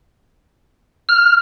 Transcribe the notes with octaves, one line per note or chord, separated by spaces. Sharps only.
F6